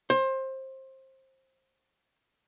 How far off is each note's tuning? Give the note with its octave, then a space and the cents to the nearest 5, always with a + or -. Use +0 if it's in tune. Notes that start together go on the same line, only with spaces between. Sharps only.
C5 +20